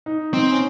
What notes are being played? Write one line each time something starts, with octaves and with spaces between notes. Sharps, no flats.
D#4
C4 D#4
C#4